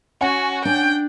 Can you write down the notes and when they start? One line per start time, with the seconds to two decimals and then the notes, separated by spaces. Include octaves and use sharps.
0.21 C#4 F#4 F#5 G#5
0.65 D4 G5